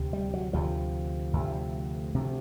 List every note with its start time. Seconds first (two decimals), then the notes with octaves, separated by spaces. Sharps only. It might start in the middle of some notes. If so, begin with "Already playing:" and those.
Already playing: D2 C3
0.13 G3
0.34 F#3
0.53 D2 C3 F3
1.33 D2 C3
2.15 D2 C3